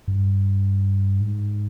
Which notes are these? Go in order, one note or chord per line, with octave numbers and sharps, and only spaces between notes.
G2
G#2